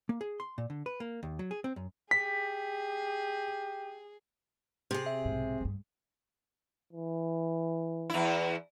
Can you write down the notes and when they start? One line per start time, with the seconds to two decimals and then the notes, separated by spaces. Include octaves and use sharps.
0.09 A#3
0.21 G#4
0.40 C6
0.58 A#2
0.70 D3
0.86 B4
1.00 A#3
1.23 D#2
1.39 F#3
1.51 G#4
1.64 C4
1.76 F#2
2.11 G4 G#4 B6
4.91 C3 G#4
5.06 E5
5.25 B1 G#2
5.61 G2 G#3
6.93 E3
8.10 E2 E4